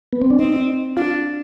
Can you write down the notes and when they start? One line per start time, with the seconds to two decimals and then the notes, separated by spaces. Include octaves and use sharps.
0.13 B3
0.22 C4
0.30 D4
0.39 C4 D#4
0.97 D4 F4